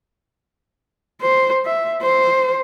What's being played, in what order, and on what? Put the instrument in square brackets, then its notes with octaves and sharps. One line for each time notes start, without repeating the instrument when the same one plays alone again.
[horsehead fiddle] C5
E5
C5